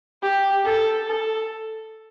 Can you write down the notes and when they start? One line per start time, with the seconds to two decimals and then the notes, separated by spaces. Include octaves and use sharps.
0.22 G4
0.64 A4
1.07 A4